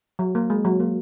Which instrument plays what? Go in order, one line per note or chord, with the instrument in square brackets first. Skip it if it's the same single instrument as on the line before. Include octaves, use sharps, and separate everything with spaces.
[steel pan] F#3
A#3
G#3
F#3
A#3